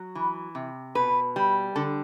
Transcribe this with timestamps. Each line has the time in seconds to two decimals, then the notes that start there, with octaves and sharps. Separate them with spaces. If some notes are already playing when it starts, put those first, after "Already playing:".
Already playing: F#3
0.15 E3
0.55 C3
0.95 B2 B4
1.36 G3
1.76 D3 A4